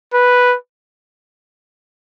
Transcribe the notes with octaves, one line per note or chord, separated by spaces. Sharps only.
B4